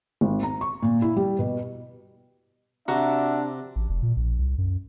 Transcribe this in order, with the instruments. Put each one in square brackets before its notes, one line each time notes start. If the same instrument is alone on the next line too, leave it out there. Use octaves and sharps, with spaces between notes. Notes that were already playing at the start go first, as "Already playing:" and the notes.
[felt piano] G#1
A#5
C#6
A#2
E4
G3
B2
[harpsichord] C3 A#5 [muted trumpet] D4 [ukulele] F#4 [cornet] E5
[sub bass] A1
F1
A#2
A#1
C2
F#2